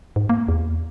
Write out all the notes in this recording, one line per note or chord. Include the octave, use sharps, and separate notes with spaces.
G#2
A#3
E2